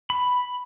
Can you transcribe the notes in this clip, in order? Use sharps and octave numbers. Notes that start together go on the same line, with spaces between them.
B5